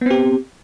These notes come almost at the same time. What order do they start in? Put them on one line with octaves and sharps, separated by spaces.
B3 C4 G4